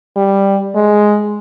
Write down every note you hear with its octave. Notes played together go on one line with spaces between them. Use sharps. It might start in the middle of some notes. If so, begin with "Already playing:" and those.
G3
G#3